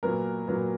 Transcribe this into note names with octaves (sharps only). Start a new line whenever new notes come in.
A#2 F#3 B3 A#4
A#2 F#3 B3